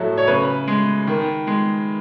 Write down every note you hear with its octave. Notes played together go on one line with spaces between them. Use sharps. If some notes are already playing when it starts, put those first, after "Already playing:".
Already playing: A2 F#3 A3
C#5
C#3 B4
G#3
D#3
G#3